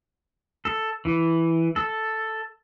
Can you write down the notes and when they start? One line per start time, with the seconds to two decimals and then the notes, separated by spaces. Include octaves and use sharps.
0.65 A4
1.05 E3
1.76 A4